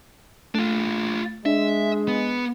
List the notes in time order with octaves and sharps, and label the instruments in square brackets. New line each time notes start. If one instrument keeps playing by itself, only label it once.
[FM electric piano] A3 [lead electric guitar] D4 F4
[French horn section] G#3 [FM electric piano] D4 [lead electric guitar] E5
[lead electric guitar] B3